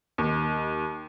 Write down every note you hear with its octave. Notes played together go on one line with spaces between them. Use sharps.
D#2